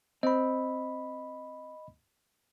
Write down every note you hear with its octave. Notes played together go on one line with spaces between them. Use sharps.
C4 D#5 B5